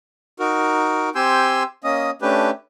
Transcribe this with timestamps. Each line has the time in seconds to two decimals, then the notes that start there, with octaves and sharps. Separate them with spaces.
0.40 D#4 F#4 A#4
1.15 C4 G4 G#5 C6 E6 G6
1.84 A#3 C#4 D#5 D#6
2.22 A3 C#4 D4 G4 B4